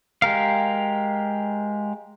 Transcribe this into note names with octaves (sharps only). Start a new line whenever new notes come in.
G#3 G4 A#4 F5